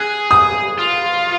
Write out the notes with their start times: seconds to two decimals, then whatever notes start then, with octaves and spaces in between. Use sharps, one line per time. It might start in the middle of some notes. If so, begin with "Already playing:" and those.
Already playing: G#4 F#6
0.31 D#6
0.79 F4